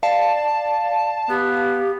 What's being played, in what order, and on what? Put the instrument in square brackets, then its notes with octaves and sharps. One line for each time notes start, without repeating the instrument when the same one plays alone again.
[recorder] D5 [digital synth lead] F5 [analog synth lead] A5
[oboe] B3 [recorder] G4